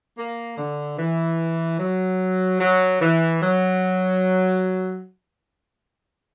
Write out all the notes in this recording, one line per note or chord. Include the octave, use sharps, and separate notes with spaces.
A#3
D3
E3
F#3
F#3
E3
F#3